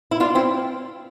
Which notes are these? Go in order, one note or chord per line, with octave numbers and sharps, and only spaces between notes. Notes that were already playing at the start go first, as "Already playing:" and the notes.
E4
D4 F4
C4 E4